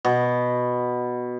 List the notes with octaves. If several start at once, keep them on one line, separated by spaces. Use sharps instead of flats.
B2